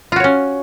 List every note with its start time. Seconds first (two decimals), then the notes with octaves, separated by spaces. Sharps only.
0.12 F4
0.16 F#4
0.20 C#5
0.24 C#4